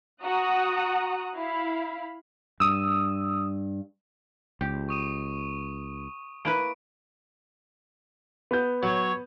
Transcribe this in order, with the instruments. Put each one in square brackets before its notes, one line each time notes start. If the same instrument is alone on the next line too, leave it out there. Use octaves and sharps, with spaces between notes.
[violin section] F#4 F#5 A#5 D#6 F#6
E4 F5 B5
[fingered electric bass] G2 [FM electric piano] D#6 E6
[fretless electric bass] C#2 [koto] G4
[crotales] C#6 D#6 D#7
[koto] A#3 E4 B4 [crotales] D7
[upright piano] B3 G6
[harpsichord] F#3 [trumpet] C#5